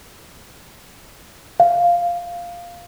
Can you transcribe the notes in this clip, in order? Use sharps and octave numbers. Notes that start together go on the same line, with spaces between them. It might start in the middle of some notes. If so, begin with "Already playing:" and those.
F5